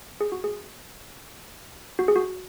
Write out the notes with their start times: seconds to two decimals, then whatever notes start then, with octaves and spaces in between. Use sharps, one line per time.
0.21 G#4
0.32 F#4
0.44 G#4
1.99 F#4
2.08 G#4
2.16 F#4